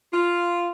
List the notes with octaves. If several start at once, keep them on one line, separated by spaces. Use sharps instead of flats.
F4